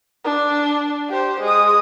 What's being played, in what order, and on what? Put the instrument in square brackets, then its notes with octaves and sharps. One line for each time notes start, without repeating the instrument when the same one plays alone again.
[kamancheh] D4
G4 C5
G#3 D#6